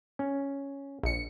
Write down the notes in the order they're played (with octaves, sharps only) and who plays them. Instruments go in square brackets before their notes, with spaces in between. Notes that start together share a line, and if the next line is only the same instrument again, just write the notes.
[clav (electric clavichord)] C#4
[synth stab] A#1 C#7